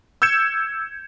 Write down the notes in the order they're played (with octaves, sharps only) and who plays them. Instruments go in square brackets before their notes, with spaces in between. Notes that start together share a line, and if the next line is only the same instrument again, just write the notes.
[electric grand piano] E6 G6 G#6 C#7 E7